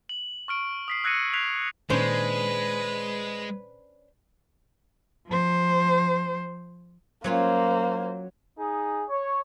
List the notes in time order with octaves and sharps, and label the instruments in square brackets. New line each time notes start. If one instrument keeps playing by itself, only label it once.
[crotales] F#7
C#6 F6 D7
D#6 B6 C7
E6 F#6 G#6 A#6 C#7 D#7
F#6 G#6 B6 C7 F7
[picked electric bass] A#2 D#3 [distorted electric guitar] G#3 [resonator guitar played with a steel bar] C#4 D4 C5 [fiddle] B4
[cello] F3 C5
[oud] F#3 C#4 F4 [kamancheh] A#3 C5
[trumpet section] D#4 G#4
C#5